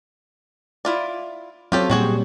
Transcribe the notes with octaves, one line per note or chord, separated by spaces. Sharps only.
E4 F4 D5
F#3 C4 F4 G4 A4 C#5
A#2 G3 C4 F#4 G#4